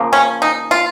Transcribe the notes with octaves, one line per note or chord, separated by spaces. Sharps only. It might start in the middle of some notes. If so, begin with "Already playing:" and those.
Already playing: C#3 F3 A#3
C#4
D#4
F4